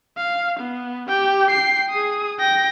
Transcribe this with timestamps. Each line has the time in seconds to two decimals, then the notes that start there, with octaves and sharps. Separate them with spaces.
0.18 F5
0.60 B3
1.09 G4 G5
1.51 G5 C7
1.90 G#4 D#6
2.40 G5 A#6